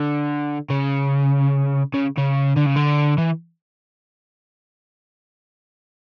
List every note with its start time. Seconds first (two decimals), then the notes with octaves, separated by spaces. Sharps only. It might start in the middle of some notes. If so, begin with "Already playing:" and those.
Already playing: D3
0.70 C#3
1.94 C#3
2.18 C#3
2.57 D3
2.67 C#3
2.76 D3
3.18 E3